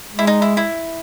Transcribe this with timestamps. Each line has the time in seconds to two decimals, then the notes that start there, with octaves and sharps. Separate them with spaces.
0.12 G#3
0.19 E4
0.27 D#4
0.42 E4
0.57 E4